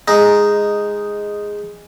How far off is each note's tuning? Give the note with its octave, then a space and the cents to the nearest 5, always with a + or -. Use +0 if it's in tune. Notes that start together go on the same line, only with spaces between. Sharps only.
G#3 -5 D#4 +0